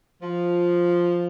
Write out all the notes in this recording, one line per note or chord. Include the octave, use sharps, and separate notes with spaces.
F3